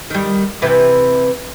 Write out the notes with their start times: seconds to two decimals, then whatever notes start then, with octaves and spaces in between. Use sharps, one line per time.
0.10 D#3 G3
0.62 C3 E3 B4